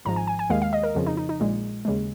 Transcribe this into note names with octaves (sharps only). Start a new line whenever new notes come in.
G#1 G#2 F3 A#5
G#5
G#5
G#5
D#2 D#3 G#3 F5
F5
D#5
A#4
F2 C#3 F3
D#4
D#4
D#4
A#1 A#2 G#3
D#2 C#3 G#3